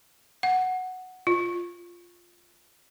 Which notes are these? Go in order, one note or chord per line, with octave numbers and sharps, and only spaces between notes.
F#5
F4